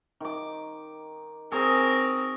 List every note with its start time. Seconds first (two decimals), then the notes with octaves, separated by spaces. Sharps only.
0.20 D#3 D6
1.52 C4 G#4 A#4 G#5 C#6